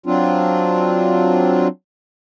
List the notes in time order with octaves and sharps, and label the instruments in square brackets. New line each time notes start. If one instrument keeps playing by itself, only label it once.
[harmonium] F#3 C4 D4 F4